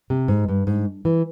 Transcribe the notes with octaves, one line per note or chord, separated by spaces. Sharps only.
C3
G#2
G2
G#2
E3